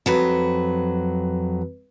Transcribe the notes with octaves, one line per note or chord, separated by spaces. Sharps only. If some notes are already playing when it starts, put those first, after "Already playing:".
F2 F#3 B4